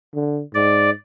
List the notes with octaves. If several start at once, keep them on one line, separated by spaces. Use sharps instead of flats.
D3
G#2 D5